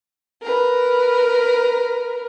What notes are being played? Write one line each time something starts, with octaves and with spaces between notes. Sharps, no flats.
A#4 B4